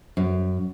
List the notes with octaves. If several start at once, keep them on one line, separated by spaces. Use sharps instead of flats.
F#2